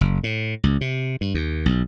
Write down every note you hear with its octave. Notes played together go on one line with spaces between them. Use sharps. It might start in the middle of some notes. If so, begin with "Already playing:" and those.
F#1
A2
C#2
C3
G2
D#2
B1